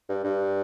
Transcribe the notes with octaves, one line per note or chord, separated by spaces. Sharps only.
G2
G2